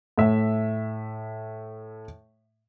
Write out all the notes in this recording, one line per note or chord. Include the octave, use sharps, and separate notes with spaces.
A2 E5